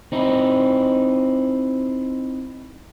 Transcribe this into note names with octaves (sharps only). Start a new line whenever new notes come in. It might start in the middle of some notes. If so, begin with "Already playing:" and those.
C4 D#4 E4